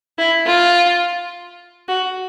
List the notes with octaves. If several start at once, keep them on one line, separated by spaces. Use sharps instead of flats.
E4
F4
F#4